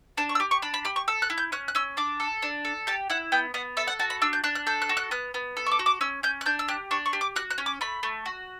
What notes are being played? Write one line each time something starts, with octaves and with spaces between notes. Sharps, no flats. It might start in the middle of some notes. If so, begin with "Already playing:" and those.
D4 A5
C#6
E6
G4 D6
C#6
D4 B5
B5
G4 B5
C#6
A4 E6
F#6
E4
G6
C#4 F#6
F#6
C#4 E6
D4 D6
A4
D4
A4
G4 A5
E4 F#5
B3 G5
B3 F#5
A4 E5
F#5
F#4 A5
B5
D4 E6
G6
D4 F#6
F#6
A4 G6
F#6
F#4
F#6
B3 F#6
B3
A4
C#6
D6
F#4
D6
C#4 E6
C#4 G6
F#6
D4 G6
E6
G4 F#6
D4 C#6
C#6
G4
D6
F#4 F#6
F#6
C#4
D6
A3 B5
A3
F#4